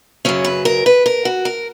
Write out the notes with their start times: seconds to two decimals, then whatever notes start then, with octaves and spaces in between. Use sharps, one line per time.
0.25 F#2 C#3 F#3 C#4
0.44 B4
0.65 A#4
0.86 B4
1.06 A#4
1.25 F#4
1.45 A#4